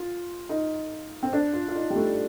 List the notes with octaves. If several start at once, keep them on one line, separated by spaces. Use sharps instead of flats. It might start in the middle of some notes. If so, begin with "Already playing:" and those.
Already playing: F4
D#4
C4
D4
F4
F4
D#4
G3
A3